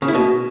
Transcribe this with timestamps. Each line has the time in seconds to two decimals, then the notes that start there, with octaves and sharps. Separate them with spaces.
0.02 C#3
0.08 E4
0.14 B2